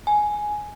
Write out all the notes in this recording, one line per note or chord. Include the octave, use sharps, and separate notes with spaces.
G#5